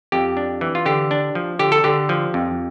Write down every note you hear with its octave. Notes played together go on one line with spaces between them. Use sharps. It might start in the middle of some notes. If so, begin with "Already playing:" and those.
F2 G4
D4
E3
F4
D3 G4
D4
F3
D3 G4
A4
D3 G4
F3
F2